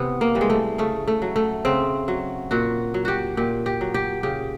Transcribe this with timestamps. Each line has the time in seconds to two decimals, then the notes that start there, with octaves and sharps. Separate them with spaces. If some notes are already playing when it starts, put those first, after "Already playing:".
Already playing: C3 E3 B3
0.21 A#3
0.35 E3 G3
0.41 G#3
0.50 A3
0.78 C#3 A3
1.08 A3
1.22 F#3
1.36 A3
1.65 C#3 C4
2.08 F#3
2.51 A#2 F#4
2.94 F#3
3.05 F#4 G4
3.37 A#2 G4
3.66 G4
3.81 F#3
3.94 G4
4.23 C#3 G4